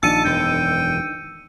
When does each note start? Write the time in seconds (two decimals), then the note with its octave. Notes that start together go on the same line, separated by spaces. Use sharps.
0.03 A#1 D#3 D4 D#4 A5 E6 C#7 D#7
0.25 E1 F#2 G5